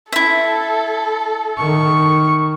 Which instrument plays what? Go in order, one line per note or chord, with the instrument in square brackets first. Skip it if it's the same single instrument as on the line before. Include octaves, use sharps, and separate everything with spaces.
[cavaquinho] E4 E5 [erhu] A4
[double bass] D#3 [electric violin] C#6